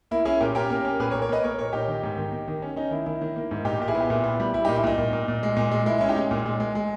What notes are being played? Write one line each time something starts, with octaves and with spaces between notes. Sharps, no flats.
A#3 E4
C#4 E4 G#4
A#2 G4 A#4
C#4 G4 A#4
A#3
C#4
A#2 G#4 B4
A#4 C#5
A#3
A#4 C#5
A#3 B4 D#5
A#3 A#4 C#5
A#2 A#4 C#5
A#2 D#4 G4
D#3
G#2
D#3
A#3
D#3
C#4
C#4 D#4
D#3 E4
D#3 E4
D#3
A#3
G#2
A#2 D#4 G4
A#2 G4
E4 G#4
B3
G4
A#2 E4
B3
G3
G3 E4
A#2 D#4 G4
E4
A#2 D#4
A#2
A#2
A#2
G#3
A#2
G#3
G#3 E4
C#4 E4
D#4 G4
G#3
A#2
G#3
G#3
G#3